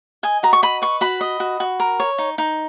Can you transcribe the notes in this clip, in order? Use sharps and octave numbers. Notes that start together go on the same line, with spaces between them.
D#5 G#5
F#4 A#5
C#6
D#5 B5
B4 C#6
F#4 B5
D#5
F#4
F#4
A#4
C#5
D#4
D#4